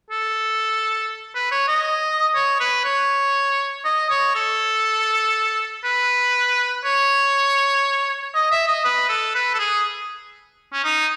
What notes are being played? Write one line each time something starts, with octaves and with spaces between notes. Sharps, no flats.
A4
B4
C#5
D#5
C#5
B4
C#5
D#5
C#5
A4
B4
C#5
D#5
E5
D#5
B4
A4
B4
A4
G#4
C#4
D#4